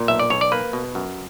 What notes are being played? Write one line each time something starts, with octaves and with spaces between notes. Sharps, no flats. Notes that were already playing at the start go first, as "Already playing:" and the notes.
Already playing: A#2
B1 E5
D5
B1 C#5
D5
A#3 B4
B2
F#2